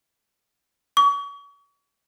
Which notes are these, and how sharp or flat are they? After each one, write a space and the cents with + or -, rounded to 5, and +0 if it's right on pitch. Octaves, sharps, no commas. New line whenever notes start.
C#6 +40